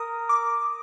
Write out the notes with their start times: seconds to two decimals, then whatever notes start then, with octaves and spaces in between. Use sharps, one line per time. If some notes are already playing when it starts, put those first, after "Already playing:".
Already playing: A#4 D#6
0.29 D6